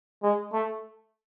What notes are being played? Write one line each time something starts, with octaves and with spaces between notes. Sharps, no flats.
G#3
A3